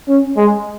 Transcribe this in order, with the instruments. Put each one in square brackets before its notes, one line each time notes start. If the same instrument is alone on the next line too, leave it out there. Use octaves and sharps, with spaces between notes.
[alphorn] C#4
[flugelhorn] G#3